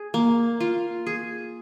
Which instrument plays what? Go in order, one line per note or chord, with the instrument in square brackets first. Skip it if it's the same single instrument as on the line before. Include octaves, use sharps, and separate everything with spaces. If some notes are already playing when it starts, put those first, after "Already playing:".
Already playing: [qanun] G#4
A#3
F4
G#4